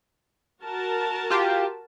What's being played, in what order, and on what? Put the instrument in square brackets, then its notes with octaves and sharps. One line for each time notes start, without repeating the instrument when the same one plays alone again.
[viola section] F#4 A#4 A5
[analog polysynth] F4 G4